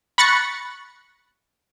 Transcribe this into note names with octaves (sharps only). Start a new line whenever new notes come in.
B5 C#6 F#6 A6 A#6 C#7